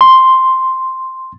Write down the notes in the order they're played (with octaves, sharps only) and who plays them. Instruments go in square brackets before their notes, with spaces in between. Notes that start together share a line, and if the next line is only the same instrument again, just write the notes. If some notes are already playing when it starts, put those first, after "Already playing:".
[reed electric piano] C6